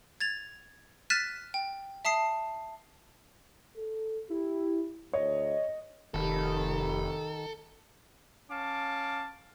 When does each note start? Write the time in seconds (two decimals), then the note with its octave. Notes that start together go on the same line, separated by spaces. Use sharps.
0.20 G#6 A6 F7
1.10 F6 F#6 A6 B6 D#7 E7
1.54 G5
2.05 E5 A5 D#6 C7
3.76 A4
4.30 E4 G4
5.13 D2 C#5 D#5
6.14 F1 D#3 G4 A4 A#4 B5
8.50 C#4 F5 A5 D6